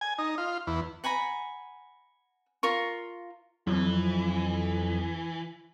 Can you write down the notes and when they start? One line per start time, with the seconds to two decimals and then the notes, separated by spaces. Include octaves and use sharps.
0.01 G#5
0.18 D#4
0.38 F4
0.67 E2
1.04 F#5 G#5 A#5 B5
2.63 F4 A#4 C#6
3.67 F2 E3 F#3